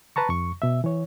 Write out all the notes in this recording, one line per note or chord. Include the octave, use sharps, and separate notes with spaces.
B4 A5 A#5 C#6
F2 C#6
B2 E5
E3 C#5